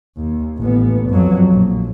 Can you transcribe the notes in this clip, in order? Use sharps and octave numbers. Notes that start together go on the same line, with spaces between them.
D#2
A1 B3
F2 F#3
A#1